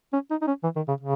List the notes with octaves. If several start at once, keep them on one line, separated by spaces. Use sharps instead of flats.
C#4
D#4
D#4
C#4
E3
D#3
C#3
C#3